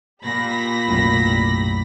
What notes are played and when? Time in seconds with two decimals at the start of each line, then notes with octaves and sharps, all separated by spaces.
0.24 A#2 G4 B5 A#6
0.88 B1 F#2 A2